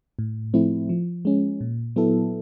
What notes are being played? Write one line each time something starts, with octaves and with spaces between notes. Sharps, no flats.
A2
F3 A3 C4 E4
F3
G#3 C#4
A#2
F#3 B3 E4 A4